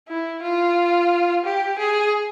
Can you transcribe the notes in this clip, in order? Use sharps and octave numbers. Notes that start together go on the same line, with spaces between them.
E4
F4
G4
G#4